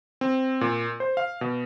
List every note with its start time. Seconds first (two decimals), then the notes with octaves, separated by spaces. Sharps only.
0.21 C4
0.61 A#2
1.00 C5
1.17 F5
1.41 B2